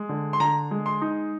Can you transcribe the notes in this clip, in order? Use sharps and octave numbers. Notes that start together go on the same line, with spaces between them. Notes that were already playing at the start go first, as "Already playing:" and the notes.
Already playing: G#3
D3
C6
D3 A#5
G#3
C6
D#4